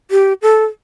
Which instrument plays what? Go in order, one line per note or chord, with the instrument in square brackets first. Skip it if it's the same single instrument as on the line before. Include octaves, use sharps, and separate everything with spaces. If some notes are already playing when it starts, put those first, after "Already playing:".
[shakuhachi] G4
A4